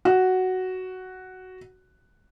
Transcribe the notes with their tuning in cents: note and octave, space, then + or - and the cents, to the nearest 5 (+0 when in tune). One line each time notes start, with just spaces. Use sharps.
F#4 +5